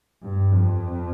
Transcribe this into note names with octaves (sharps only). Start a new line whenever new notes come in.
G2
F2